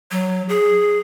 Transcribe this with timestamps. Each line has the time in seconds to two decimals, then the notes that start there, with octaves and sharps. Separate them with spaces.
0.11 F#3
0.49 G#4